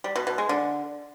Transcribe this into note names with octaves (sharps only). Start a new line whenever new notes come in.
G3
B2
B2
G#3
D3